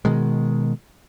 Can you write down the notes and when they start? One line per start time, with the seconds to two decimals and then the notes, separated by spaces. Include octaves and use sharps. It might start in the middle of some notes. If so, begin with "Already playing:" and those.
0.05 B2 D#3 G#3